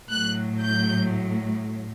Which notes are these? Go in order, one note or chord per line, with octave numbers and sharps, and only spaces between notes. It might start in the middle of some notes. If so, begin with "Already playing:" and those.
A2 F#3 F#6
G6